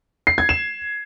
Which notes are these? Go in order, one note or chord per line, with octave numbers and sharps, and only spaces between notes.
C7
G#6
E7